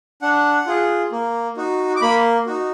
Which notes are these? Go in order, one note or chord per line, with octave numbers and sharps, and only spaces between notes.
D4 F#5
F4 G#4
A#3
D#4 F#4
D6
A#3 B5
D#4 F#4